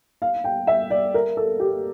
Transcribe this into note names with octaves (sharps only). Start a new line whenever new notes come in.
F5
G5
E5
D5
A#4
A4
G4